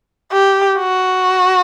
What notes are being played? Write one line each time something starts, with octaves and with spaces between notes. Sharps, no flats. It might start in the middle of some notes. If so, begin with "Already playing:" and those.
G4
F#4